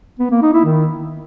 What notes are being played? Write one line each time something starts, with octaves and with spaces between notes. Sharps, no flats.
B3
A#3
D#4
E4
D#3